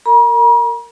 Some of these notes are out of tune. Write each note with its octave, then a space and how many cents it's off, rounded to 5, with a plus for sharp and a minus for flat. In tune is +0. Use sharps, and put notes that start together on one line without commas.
A#4 -25 A#5 +45